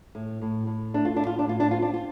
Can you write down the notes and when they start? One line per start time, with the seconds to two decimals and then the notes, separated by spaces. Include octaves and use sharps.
0.15 A2
0.42 A2
0.67 A2
0.94 A3 D4
1.05 F4
1.16 A2 D4
1.27 F4
1.39 D4
1.46 A2 F4
1.60 D4
1.71 C4 F4
1.82 D4
1.94 F4